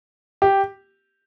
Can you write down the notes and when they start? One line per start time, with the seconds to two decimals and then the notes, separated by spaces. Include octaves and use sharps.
0.42 G4